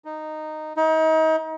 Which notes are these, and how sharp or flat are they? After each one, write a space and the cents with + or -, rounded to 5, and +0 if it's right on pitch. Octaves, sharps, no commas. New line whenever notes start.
D#4 -10
D#4 +35